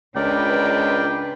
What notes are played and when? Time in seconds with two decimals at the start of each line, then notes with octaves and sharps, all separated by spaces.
0.16 C#2 D4 F4 A#4 B4 D5 G5